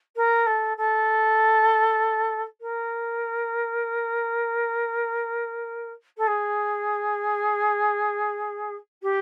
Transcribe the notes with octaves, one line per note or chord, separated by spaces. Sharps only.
A#4
A4
A4
A#4
A4
G#4
G4